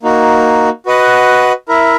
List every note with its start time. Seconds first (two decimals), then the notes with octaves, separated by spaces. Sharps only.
0.03 A#3 D#4 F#4
0.86 F#4 B4 D#5 F#5
1.69 E4 A#4 E5